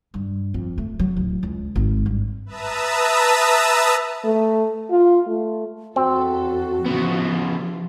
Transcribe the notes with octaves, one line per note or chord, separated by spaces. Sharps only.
G2
F2
A3
F#3
D1
C#2
G#1
G2
B4 E5 A5 A#5 D#6 E6
A3
F4
A3
E2 C4 F#4 A4
C#3 E3 F3 B3 F4